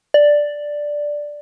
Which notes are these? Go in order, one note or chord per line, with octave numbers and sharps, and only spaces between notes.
D5